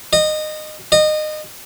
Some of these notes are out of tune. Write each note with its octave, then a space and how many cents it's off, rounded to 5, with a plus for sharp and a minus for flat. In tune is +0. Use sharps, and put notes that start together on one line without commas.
D#5 -20
D#5 -25